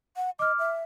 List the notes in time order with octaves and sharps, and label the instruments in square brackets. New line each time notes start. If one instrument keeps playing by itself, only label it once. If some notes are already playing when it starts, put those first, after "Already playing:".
[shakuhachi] F#5
[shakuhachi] D#5 [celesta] D6 F6
[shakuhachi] E5